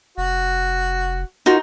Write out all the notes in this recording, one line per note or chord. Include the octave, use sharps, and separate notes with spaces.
F1 F#4
D#4 F4 F#4 A#4